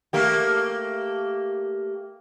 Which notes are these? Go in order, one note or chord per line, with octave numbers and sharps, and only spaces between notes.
A3 A#3 G4